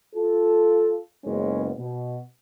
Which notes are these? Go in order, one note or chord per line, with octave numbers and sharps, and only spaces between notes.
F4 A4
F#1 C#2 G#3 B3 C#4
B2